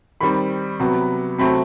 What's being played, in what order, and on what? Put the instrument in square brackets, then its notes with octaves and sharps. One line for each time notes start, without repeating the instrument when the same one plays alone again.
[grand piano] D#3 G3 C4 B5
C3 F#3 B3
C3 F#3 A3 C4 B5